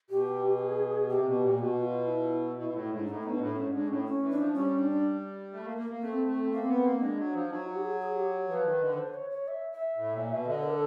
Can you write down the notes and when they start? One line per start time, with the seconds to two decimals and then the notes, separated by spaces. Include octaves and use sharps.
0.10 B2 G4
0.59 G#4
1.09 C3 G4
1.26 B2
1.41 A#2
1.58 B2 F#4
1.82 F4
2.07 E4
2.57 B2
2.73 A2
2.90 G#2
3.00 D4
3.05 A2 D#4
3.21 B2 D#4
3.30 D4
3.39 A2
3.55 G#2 C#4
3.72 G#2 D4
3.88 A2 C#4
4.05 C#4
4.22 E3
4.30 D4
4.37 F3
4.53 G3 C#4
4.79 D4
5.53 A3
5.65 A#3
5.77 A#3
5.90 A#3
6.02 A3 C4
6.27 A3
6.52 A#3 C4
6.68 B3
6.84 A#3
7.00 G#3 D4
7.17 F#3
7.33 F3
7.49 F#3 D#4
7.66 F#4
7.75 G4
7.82 G#4
7.99 G#4
8.16 G4
8.49 F3 B4
8.65 D#3
8.81 D3
8.98 C5
9.14 C#5
9.30 C#5
9.48 E5
9.72 E5
9.96 A2
10.13 A#2
10.29 B2
10.45 D3 D#5
10.63 A#4
10.71 A4